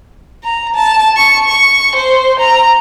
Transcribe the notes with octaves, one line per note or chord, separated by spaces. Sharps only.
A#5
A5
C#6
C#6
C5
A#5